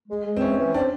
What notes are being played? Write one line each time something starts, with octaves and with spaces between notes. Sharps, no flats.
G#3
G#3
C4
E3 C#4
E3
C4 D4